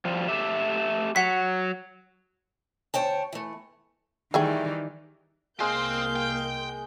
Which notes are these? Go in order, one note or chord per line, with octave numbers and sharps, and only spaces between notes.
F3 G3
A3 G4 E5
F#3 F#5 B6
D2 C5 C#5 G5 A5
E3 A3
D#3 E3 G3 A3 G#4 G5
C2 G#3 A#3 C4 C5 F5 G6
G5